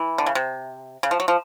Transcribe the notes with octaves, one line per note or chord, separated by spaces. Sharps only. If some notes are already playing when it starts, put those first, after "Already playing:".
Already playing: E3
D3
C#3
C3
C#3
F3
F#3
F3